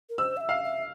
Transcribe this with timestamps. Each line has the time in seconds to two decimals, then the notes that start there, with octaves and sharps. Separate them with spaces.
0.10 A#4
0.18 C5 E6
0.37 F5
0.41 E5
0.49 F5
0.64 E5